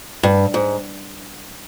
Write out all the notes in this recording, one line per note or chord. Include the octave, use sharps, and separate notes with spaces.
G2
G#2